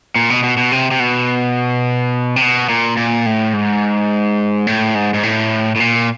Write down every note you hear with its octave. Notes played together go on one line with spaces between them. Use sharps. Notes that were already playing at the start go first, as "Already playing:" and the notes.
A#2
B2
B2
B2
C3
C3
B2
C3
B2
A#2
A#2
A2
G#2
A2
G#2
G#2
A2
A2
A#2